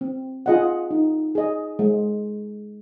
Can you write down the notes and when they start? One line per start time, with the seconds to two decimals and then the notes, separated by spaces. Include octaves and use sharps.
0.01 C4
0.46 F4 G#4 D#5 F#5
0.91 D#4
1.35 G#4 D#5
1.79 G#3